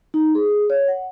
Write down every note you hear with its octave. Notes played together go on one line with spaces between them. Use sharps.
D#4
G#4
C#5
F#5